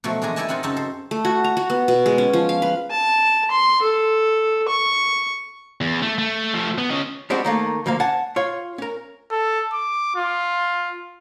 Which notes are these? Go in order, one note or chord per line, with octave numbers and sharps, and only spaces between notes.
B2 F3 F#3 A3 B3
A#2 E3 G#3 D4 G#5 A#5
E4 G4 A4 D5 G#5 A5
C4 D#4 F4 F#5 G#5 A#5
F#2 C#3 C4 D#4 E5 A5
A4 C5
A3
F#4
A#5
F#4
B3
B2
G#3
C#4
F3
F5
B4
A5
C6
A4
C#6
E2
A3
A3
F3 A3
B3
C#4 D#5
G3 G#3 C4 D4 F#4 G4
D#3 A3 A#3
D2 F3 A#3 F5
F#5 G#5 A5
F4 C#5
C#4 A#4
A4
D6
F4